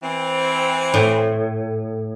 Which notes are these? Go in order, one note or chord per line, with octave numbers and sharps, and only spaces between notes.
E3 C4
A2